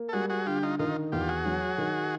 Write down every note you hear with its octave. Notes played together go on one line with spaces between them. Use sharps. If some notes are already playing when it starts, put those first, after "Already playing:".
Already playing: A#3
A4
G3 F#4 G#4
F#4 G#4
D3 F4 G4
D#4 F4
D#3 D#4 F4
E2 F4 G4
F#4 G#4
F#3
D#3